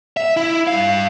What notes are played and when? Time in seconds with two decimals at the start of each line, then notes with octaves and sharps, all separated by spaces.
0.17 E5
0.37 E4
0.67 G2 F5